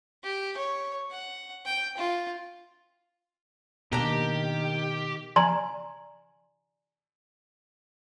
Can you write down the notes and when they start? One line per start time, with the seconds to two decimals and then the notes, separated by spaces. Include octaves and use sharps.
0.23 G4
0.57 C#5
1.11 F#5
1.66 G5
1.98 F4
3.93 B2 D#3 A#3 D4 G4 A#4
5.36 D5 G#5 A#5 C6